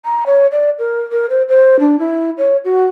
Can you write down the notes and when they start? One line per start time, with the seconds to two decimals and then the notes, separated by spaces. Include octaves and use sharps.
0.05 A#5
0.26 C#5
0.52 D5
0.79 A#4
1.12 A#4
1.30 C5
1.49 C5
1.80 D4
1.99 E4
2.38 C#5
2.65 F#4